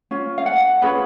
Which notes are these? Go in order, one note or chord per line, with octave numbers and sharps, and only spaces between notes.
C#4 F4
F5
F#5
C#4 F4 G#4 B4 B5